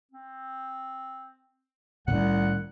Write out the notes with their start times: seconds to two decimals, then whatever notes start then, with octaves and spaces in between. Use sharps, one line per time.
0.12 C4
2.07 C2 A2 D#3 C#4 F#5